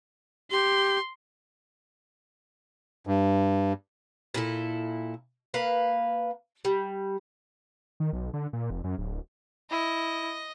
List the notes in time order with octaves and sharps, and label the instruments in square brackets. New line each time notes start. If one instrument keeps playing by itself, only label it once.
[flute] G4 [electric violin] C6
[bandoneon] G2
[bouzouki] A#2 E4 A4
A#3 B4 F5
G3
[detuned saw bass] D#3
B1
D3
A#2
F1
F#2
D1
[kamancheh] E4 [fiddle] D#5